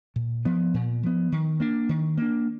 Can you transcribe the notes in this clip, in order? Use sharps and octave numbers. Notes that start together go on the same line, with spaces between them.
A#2
F3 B3
A#2
F3 B3
D#3
A#3 D4
D#3
A#3 D4